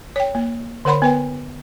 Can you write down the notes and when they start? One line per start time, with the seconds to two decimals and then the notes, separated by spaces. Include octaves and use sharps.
0.16 C#5 G5
0.35 A#3
0.85 D3 A#4 C#5 F#5 B5 C6
1.02 B3 B4 G5